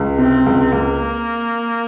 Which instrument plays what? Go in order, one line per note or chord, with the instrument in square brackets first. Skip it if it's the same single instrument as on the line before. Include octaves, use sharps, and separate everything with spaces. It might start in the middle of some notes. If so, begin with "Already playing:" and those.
Already playing: [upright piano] C#2
[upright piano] C3 [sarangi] C4
[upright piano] C#2
[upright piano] C#2 [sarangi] A#3